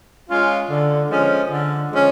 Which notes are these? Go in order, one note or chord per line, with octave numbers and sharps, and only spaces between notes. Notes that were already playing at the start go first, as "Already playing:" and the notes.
G#3 C#4 F4
D3
F3 G#3 C#4
D3
F3 G#3 C#4